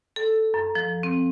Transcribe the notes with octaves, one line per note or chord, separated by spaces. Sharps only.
A4
F#2
F3
C4